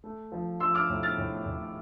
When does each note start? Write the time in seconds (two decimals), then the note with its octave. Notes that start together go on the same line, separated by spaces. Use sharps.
0.04 A3
0.32 F3
0.60 F3 C6 E6
0.74 D6 F6
0.89 A2
1.03 F6 A6
1.18 A2
1.45 A2